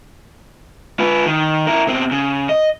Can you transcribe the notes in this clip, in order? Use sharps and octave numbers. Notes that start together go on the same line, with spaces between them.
F4 B4
D#3
E4 A#4
B2 C4
C#3
D#5